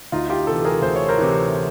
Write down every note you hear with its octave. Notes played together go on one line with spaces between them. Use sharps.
D2 D#4 F4
F4 G4
C3 E3 G4 A4
G#4 A#4
D2 C5
C#5
A#4 C5
C3 E3